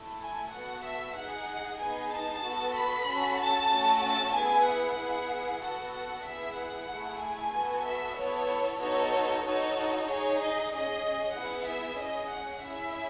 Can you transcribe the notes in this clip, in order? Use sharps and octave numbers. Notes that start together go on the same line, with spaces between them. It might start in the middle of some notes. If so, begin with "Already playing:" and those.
Already playing: A3 E4 A4
G#5
B3 F#4 A4 F#5
E5
D#4 G#4 F#5
B3 D#4 G#4 G#5
A5
B3 F#4 A4
B5
C#4 F#4 A4
A5
A3 C#4 F#4 A4
A5
B3 E4 G#4 G#5
F#5
B3 E4 G#4
B3 F#4 A4 F#5
F#5
B3 E4 G#4 E5
F#5
A3 E4 G#4
G#5
B3 F#4 A4
E5
B3 E4 A4 C#5
B3 D#4 F#4 A4 C#5
D#4 F#4 A4 C#5
D#4 G#4 C#5
D#5
C#4 G#4 D#5
B3 E4 G#4 F#5
E5
C#4 G#4 D#5
F#5
C#4 E4 G#4 E5